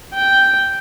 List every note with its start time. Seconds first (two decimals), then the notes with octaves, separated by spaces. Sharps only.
0.14 G5